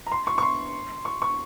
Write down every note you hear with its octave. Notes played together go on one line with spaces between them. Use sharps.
A#5
C6
C#6
C#6
C6
C#6
C#6